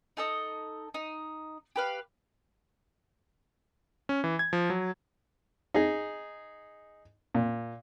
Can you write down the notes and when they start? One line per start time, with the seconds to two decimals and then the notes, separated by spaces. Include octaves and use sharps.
0.17 D#4 A4 D#5
0.94 D#4
1.76 G4 B4 F5
4.09 C#4
4.24 E3
4.39 G#6
4.53 F3
4.70 F#3
5.74 D#4 G#4
7.35 A#2